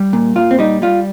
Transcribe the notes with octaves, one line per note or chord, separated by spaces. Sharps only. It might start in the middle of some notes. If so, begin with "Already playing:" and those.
Already playing: G3
A#2
A#2 F4
C4
G3 D#4
G3 F4